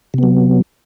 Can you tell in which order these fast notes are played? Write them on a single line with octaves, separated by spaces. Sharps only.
C3 B3 F#3